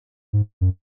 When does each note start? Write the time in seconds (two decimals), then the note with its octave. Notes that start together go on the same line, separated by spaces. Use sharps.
0.33 G#2
0.61 F#2